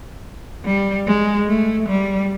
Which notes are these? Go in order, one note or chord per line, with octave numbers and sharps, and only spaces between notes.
G3
G#3
A3
G3